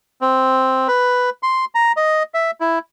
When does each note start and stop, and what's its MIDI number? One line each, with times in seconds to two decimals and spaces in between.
0.21 0.88 60
0.88 1.30 71
1.43 1.65 84
1.75 1.92 82
1.97 2.23 75
2.34 2.51 76
2.60 2.79 64